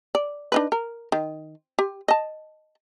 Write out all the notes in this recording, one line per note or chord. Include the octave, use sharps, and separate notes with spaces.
D5
D4 D#4 B4
A#4
D#3
G4
D#5 A5